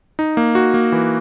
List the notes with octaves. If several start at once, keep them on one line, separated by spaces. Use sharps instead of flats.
D#4
A#3
F#4
A#3
E3